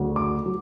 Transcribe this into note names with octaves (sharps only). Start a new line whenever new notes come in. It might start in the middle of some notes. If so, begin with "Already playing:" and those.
Already playing: D2 C#3 F#3
D6
F#3